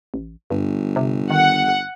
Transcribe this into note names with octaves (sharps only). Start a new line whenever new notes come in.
A1
G1 G2
C3
D#3 F#5